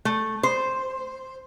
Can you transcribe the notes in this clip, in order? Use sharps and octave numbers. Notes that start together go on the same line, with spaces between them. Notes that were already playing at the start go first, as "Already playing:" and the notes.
A3
C5